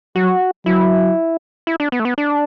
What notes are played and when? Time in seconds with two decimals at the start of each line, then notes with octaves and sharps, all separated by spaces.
0.16 F#3 F#4
0.66 F#3 E4
1.67 E4
1.80 D4
1.92 B3
2.00 A3
2.05 B3
2.18 D4